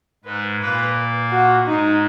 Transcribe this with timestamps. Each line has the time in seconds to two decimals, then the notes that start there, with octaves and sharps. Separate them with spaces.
0.24 G#2 G#3 B4
0.60 A#2 A#3 B4
1.31 F#4
1.66 G#2 G#3 D#4